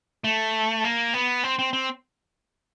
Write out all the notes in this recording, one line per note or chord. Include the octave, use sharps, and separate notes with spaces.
A3
A#3
B3
C4
C4
C4